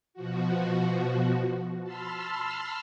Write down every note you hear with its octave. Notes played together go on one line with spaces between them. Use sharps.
B2 F3 F#4
A5 B5 C6 E6 F6